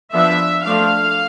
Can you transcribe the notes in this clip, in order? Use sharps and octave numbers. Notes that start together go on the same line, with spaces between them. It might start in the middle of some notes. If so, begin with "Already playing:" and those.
F3 B3 D4 E5
F3 A3 D4 F5